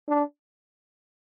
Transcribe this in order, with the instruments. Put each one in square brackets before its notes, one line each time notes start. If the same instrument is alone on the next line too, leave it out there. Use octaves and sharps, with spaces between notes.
[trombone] D4